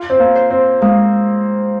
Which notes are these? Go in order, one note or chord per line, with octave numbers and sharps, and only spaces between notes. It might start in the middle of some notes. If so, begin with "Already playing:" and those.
Already playing: F4
C4
A#3
C5
C4
G#3 A#3